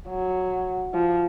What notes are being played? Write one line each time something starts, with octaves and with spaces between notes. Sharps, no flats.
F#3
F3